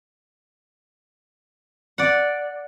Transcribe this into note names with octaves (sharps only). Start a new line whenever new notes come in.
D5 F#5